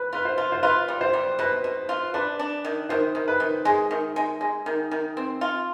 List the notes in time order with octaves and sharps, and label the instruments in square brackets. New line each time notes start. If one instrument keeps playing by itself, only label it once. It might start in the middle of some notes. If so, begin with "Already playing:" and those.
Already playing: [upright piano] B4
[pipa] F4 [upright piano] B4
[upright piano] C5
[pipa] F4
[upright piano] C5
[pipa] F4 [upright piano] B4
[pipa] G3
[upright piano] C5
[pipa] G3
[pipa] B2 [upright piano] B4
[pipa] B2
F4
[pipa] D4 [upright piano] B4
[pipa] D4
D#3
[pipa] D#3 [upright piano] C5
[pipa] D#3
[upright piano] B4
[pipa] D#3
[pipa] G#3 [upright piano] G#4
[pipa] D#3
G#3
G#3
D#3
D#3
C4
F4